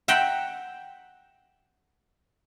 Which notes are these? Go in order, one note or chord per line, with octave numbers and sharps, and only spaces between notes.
E5 F#5 G5 A#5 C6